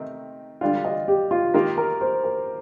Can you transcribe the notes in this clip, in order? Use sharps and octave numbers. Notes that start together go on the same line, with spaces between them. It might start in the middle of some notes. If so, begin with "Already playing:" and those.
Already playing: C3 D#3 A3 C4 D#4
D3 G3 D4 F4 F5
D#5
G4
F4
D#3 A#3 F4 G4
A#4
C5
A#4